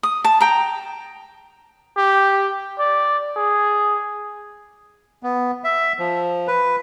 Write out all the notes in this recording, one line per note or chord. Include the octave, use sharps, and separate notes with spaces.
D#6
A5
G5 A#5
G4
D5
G#4
B3
E5
F3
B4